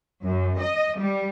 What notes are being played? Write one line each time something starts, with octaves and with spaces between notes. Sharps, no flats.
F#2
D#5
G3